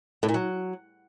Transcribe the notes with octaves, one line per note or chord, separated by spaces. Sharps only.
A2
A#2
F#3